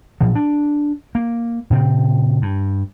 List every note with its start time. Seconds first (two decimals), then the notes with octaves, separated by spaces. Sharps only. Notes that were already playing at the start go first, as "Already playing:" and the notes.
0.21 A#2 F3 F#3
0.35 D4
1.15 A#3
1.70 A#2 C#3 C4
2.42 G2